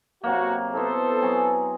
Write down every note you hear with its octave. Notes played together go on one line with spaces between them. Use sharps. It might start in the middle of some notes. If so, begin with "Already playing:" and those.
C3 F#3 A#3 F#4
B3 E4 A4 A#4 C5
F#3 C4 G#4